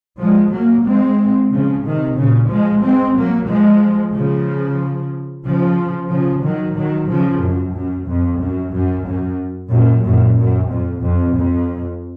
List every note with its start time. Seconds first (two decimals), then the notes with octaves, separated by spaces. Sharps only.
0.20 F3 G#3
0.52 F#3 A#3
0.85 G#3 C4
1.51 C#3 F3
1.84 C3 D#3
2.16 A#2 C#3
2.49 F3 G#3
2.82 G#3 C4
3.15 F#3 A#3
3.48 F3 G#3
4.13 C#3 F3
5.44 C#3 F3
6.10 C#3 F3
6.42 D#3 F#3
6.75 D#3 F#3
7.08 C#3 F3
7.41 F#2
7.73 F#2
8.07 F2
8.39 F#2
8.72 F#2
9.05 F#2
9.70 F#2 A#2
10.03 F#2 A#2
10.36 F#2
10.69 F2
11.02 F2
11.34 F2